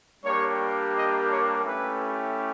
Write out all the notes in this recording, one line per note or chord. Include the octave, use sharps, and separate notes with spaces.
G3 A#3 D4 G4 C#5
D#5
C#5
A3 C#4 E4 G4 B4